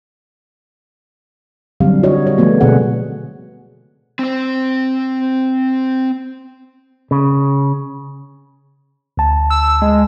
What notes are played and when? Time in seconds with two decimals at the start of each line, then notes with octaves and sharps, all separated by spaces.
1.80 D3 F#3 G3 C4 F5
2.03 F4 F#4 C#5 D#5
2.27 C#5
2.38 F3 A3 B3 F#4
2.61 B2 D3 A#3 C4 G#4 F#5
4.19 C4 C5
7.11 C#3
9.17 D2 A5
9.50 E6
9.82 G#3